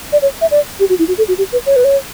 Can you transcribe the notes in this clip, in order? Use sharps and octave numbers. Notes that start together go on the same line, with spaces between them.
D5
C#5
E5
D5
G4
F#4
E4
F#4
A4
F#4
G4
B4
C#5
B4
C#5